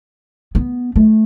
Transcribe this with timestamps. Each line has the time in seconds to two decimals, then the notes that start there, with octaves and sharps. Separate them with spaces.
0.55 B3
0.96 A3